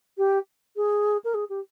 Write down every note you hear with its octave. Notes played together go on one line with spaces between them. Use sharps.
G4
G#4
A#4
G#4
G4